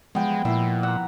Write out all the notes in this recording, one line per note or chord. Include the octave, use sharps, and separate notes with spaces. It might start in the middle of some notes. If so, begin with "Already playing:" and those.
F3 G3 G#3 B3 G5
A#2 E4 E6 A#6 C7
F#5 A#5 E6